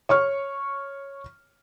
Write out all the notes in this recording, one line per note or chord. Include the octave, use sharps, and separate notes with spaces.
C#5 C#6 F6